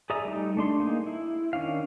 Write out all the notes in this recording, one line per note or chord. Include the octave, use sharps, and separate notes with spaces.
G#4 D5 E5 A#5 D#6
G3 A3 D#4
A3 D4 C6
A#3 D#4 G#4
E4
D#3 C#4 D4 F5